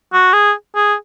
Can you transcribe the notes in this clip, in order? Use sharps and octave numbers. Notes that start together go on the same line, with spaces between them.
F#4
G#4
G#4